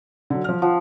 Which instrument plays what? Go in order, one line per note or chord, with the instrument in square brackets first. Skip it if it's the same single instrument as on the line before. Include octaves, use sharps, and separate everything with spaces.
[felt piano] D3 F#3
F3 F6
[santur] F3 [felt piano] F#5